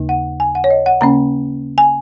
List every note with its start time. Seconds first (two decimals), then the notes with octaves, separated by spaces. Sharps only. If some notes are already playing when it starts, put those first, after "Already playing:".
Already playing: D#2 C#3 A#3 D#4
0.09 F#5
0.40 G#5
0.55 F#5
0.64 C#5
0.71 D#5
0.86 F#5
1.01 C#3 A#3 C#4 A#5
1.78 G#5